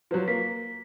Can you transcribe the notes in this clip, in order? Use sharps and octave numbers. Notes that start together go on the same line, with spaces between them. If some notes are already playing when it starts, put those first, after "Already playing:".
F3 F#3 B4
A#3 B6